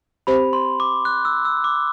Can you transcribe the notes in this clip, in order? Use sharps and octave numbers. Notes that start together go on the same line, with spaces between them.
C4 G4 C5 B5
C6
D6
F#6
E6
E6
D6